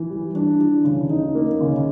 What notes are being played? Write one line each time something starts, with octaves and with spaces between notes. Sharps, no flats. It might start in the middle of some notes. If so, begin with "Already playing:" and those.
Already playing: E3
G3
D4
E3
C#3
D#4
A#3
C#3